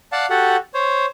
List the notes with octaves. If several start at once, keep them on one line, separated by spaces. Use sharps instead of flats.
D5 F5 F#5 A5
F#4 G4 A4 F#5
C5 C#5